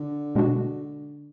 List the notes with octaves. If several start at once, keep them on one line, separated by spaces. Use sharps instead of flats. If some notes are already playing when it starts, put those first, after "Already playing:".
Already playing: D3
B2 G#3 D4 F#4